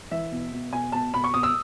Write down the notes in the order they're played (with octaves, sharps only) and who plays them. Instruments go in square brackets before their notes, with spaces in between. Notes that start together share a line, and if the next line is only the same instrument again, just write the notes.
[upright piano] E3 E5
B2
B2
B2 G#5
B2 A5
B2 B5
C#6
B2 D#6
E6